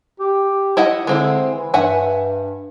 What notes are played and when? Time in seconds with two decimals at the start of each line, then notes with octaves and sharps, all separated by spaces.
0.20 G4
0.77 E4 D#5 F#5
1.07 D3 G#3 C4 E4
1.53 E3
1.74 G2 E5 F#5 G#5